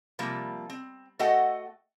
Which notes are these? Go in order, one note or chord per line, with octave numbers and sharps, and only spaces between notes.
C3 F3 G3 A#3
C4
A3 F#4 A4 D#5 F#5 G5